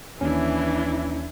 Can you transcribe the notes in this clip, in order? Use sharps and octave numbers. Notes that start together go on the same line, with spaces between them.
D#2 E3 C#4 D4 E4